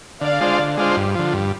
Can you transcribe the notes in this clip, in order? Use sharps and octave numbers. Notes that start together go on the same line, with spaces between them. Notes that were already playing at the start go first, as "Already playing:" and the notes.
D3 D5 F5
G#3 D4 F4 C5
D3
G#3 D4 F4 C5
G2
D3 F3
G2